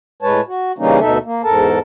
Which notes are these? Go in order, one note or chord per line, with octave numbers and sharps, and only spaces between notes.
A2 G#3 B4 C#5 A5
F#4
C#3 E3 G3 A#3 C#4 D#4
D2 B2 D#4 A4 E5
A#3
E2 G#2 A4 A#4 A5